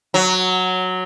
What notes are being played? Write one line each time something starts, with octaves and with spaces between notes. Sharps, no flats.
F#3